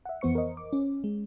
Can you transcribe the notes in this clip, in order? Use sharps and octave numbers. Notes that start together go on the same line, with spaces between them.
E5 F#5
F2 E3 B3 C5 C#6 C#7
A#4 C5 D#5
D6
C#4
G#3